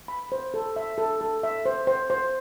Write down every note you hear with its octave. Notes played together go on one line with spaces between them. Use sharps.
B5
C5
A4
E5
A4
A4
E5
C5
C5
C5